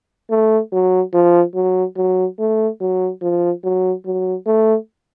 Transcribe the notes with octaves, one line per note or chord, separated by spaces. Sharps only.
A3
F#3
F3
F#3
F#3
A3
F#3
F3
F#3
F#3
A3